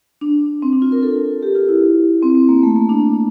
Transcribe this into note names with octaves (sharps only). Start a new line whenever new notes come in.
D4
C4
D4
F4
A#4
A4
G4
F4
E4
C4
C4
A#3
A3
A#3
D4